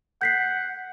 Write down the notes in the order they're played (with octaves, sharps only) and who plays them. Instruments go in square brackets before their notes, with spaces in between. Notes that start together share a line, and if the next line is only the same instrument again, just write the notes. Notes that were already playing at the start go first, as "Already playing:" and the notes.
[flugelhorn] F#5 [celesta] G6 B6 C7